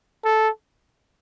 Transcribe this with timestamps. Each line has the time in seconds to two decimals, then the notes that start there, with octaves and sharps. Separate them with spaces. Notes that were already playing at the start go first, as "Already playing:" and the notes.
0.25 A4